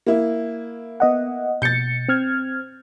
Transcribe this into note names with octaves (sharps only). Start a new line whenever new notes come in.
A#3 E4
B3 D#5 F#5
B2 G6 A6 C#7
C4 F6 G#6